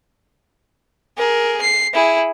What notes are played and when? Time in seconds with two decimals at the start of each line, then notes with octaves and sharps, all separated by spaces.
1.18 G#4 A#4
1.62 C7
1.94 E4 G#4